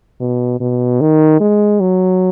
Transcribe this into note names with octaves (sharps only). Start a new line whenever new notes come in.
B2
B2
D#3
G#3
F#3